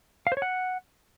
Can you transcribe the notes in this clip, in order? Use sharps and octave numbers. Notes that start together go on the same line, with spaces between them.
F5
C5
C#5
F#5